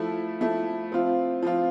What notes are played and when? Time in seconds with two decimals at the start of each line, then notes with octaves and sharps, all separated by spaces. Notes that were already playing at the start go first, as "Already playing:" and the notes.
Already playing: F3 A3 E4
0.41 F3 A3 E4
0.92 F3 C4 F4
1.42 F3 C4 F4